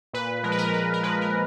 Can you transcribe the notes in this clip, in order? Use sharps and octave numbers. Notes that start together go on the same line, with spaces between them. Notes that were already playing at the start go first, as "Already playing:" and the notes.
A#2 B4
F3 G#3 A#4
B4
A#4
A#2 B4
A#4
F3 G#3 B4
A#4